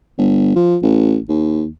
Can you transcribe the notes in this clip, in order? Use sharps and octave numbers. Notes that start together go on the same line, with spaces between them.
G1
F3
A1
D#2